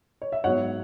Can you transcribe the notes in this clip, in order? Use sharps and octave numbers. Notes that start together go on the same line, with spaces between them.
C#5
E5
G#2 F#3 B3 C#5 F#5